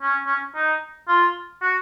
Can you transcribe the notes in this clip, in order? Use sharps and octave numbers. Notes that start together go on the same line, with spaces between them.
C#4
C#4
D#4
F4
F#4